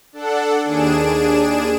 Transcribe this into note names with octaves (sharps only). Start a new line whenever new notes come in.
D4 A4 F#5
D#2 D4 G#4 D7 E7